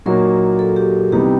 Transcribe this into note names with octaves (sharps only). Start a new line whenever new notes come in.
A#2 F#3 A#3 D#4 F#4 A#4
A4
G4
C3 E3 G3 B3 D#4 G4